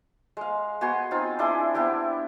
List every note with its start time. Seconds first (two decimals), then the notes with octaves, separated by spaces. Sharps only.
0.37 G#3 F5
0.81 B3 F#4 G#5 C6
1.11 C4 D#4 F4
1.39 D4 E4 G#4 C6
1.74 B3 D4 E4 G4